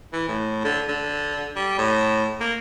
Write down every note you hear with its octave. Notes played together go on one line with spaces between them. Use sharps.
E3
A2
D3
D3
G3
A2
A#3